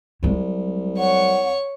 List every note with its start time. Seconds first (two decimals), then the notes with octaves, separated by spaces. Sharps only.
0.23 C2 F#3 G#3
0.98 C#5 F#5 C#6